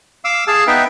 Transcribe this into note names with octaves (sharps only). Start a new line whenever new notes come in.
F5 D6 E6
G#4 F5 A5 E6
B3 D#4 B4 E5 G5